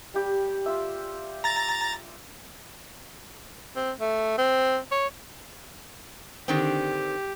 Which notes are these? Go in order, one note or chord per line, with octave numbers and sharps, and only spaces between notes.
G3 G4
F4 E5
A#5 A6
C4
A3
C4
C#5
D3 D#3 C4 G4